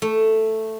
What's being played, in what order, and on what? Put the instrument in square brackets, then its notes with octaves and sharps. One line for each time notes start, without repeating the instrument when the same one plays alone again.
[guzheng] A3